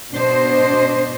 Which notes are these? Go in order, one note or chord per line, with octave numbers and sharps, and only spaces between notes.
B2 D4 C5 D#5